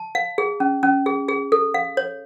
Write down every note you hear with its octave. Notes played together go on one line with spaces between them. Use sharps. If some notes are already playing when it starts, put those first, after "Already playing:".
Already playing: A5
F5
G#4
C#4
C#4
G#4
G#4
A4
F5
C#5